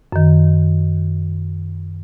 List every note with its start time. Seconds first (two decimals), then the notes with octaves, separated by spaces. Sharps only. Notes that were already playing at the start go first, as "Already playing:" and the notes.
0.12 F#2 D#3